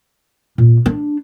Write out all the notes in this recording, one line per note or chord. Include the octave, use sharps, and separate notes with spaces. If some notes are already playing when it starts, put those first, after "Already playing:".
A#2
D4